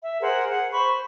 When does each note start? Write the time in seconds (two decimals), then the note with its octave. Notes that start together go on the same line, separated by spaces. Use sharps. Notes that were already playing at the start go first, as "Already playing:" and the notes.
0.03 E5
0.20 G#4 A#4 C5 F#5
0.49 G#4 F#5
0.72 C5 B5 C#6